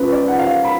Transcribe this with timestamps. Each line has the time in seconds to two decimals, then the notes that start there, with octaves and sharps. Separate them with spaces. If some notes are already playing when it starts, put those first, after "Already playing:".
Already playing: C#2 C#3 F3 B4
0.12 D5
0.28 F#5
0.39 F5
0.65 B5